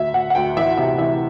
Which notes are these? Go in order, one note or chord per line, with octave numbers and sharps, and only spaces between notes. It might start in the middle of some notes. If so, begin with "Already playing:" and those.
Already playing: D2 E5
D2 F#5
F#5
D2 G5
E3 E5
C3 E5
E3 E5